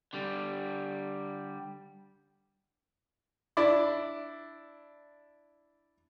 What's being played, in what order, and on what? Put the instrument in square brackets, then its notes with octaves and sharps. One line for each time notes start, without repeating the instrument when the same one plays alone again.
[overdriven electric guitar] D3 G3
[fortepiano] D4 E4 D5